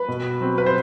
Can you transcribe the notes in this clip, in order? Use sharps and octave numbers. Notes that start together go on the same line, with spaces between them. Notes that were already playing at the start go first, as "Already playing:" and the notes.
Already playing: B4
B2
F#3 C4
B4
C5